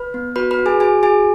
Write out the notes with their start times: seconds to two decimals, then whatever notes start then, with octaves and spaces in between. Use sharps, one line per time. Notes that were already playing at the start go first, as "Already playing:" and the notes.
Already playing: B4 B5
0.14 B3
0.36 F#4 B4 B5
0.51 B4 B5
0.59 F#4
0.66 G#4 G#5
0.80 F#4 G#4 G#5
1.03 F#4 G#4 G#5